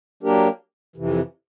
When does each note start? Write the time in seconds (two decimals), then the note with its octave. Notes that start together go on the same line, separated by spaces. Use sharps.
0.23 F#3 A#3 D4 G4 A#4
0.96 F2 C3 E3